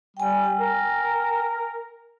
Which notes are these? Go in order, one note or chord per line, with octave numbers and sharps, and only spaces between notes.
G3 G5 G#5
A#4